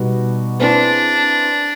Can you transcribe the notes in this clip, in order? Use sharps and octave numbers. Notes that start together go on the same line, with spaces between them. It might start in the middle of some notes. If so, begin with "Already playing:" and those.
Already playing: B2 G3 B3 D#4 F#4
C4 D4 E4 G#4 B4